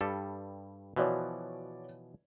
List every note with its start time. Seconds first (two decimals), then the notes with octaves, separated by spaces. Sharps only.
0.01 G2 G3 A4
0.96 B2 E3 F3 F#4 C#5 D5